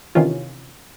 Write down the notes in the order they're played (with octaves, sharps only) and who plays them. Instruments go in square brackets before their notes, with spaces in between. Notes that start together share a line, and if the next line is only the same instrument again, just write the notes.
[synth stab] C3 D#3 E3 C#4 F4